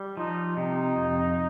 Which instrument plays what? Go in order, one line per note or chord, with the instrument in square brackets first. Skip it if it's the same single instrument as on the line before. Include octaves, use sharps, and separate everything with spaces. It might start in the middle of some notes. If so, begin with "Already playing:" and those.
Already playing: [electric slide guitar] G3
[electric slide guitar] F3 [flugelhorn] D#4
[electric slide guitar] C3 [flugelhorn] D#4
[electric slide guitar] F2